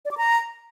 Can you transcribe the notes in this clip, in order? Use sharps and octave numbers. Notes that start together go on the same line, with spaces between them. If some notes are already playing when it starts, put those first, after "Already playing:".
D5
D6
A#5